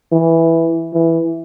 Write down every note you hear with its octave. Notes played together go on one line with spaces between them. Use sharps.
E3
E3